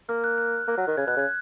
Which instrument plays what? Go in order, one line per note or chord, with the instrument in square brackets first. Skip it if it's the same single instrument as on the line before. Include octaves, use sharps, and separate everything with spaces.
[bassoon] A#3 [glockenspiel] F6
[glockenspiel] F#6
F#6
[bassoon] A#3
F#3
D#3
[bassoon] C#3 [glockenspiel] G#6
[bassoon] B2 [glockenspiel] F#6
[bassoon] C#3 [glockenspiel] G#6